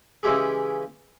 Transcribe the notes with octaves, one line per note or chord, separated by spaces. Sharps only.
C#3 E3 G#3 E4 G4 G#4